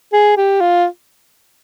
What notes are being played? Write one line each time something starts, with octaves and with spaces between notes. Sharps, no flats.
G#4
G4
F4